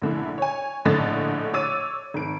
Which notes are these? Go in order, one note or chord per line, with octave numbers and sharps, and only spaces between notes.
A#1 D3 E4
C#5 G#5
A#1 A2 D3 D#5 A6
C#5 D6 E6 A6 D#7
G#1 D7